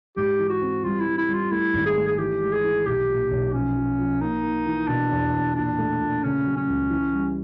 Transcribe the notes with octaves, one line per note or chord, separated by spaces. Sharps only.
G#2 G4
E3
F#4
C4
G3 F4
E4
G3
E4
G3 F4
A3 E4
G#1
G#4
A3
G#4
E3 G4
G#3
G#4
E3
B1 G4
A#2
B1
F3 C#4
F3
F3
A#3 D#4
A#3
E3
B2 D4
E2
E2
A#2 D4
A3
A#2
C#3 C#4
F#3
C#4
C#2
E3
G3